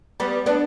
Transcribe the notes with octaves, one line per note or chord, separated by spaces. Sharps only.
G3 B3
B3 D4